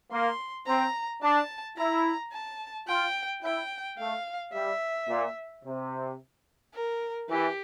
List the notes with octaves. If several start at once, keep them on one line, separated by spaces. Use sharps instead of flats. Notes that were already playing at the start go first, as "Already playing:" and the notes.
A#3 C6
C4 A#5
D4 A5
E4 A#5
A5
F4 G5
E4 G5
A3 F5
G3 E5
A#2
C3
A#4
E3 G4